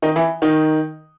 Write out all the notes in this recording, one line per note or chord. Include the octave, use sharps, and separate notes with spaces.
D#3 D#4
E3 E4
D#3 D#4